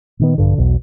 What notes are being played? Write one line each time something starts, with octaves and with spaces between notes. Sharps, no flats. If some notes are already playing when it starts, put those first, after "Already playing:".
A#2 D#3 B3
A#1 G2 D3
B1 E2 B2